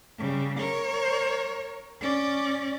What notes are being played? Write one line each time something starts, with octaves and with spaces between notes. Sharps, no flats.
C#3 G3
A#4 C#5
C#4 D5